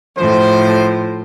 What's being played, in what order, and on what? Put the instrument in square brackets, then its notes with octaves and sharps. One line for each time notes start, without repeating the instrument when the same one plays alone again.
[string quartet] A2 F3 [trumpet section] C5